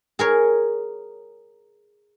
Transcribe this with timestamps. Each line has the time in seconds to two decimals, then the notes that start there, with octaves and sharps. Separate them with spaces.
0.19 G#4 A#4 C#5